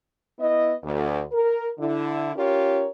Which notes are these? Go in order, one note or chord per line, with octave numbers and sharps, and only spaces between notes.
B3 E4 D#5
D2
A#4
D3 E4
C#4 F4 G4 A#4 C#5